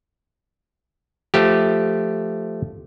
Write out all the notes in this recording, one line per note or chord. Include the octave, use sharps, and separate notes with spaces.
F3 A3 G4